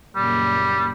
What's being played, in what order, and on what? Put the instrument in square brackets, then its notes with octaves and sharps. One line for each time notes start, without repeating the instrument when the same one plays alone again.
[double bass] F#1 A#2 [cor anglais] G3